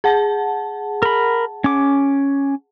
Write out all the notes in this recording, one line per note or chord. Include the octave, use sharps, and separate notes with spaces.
G#4 F#5 A5
A#4 B5
C#4 D6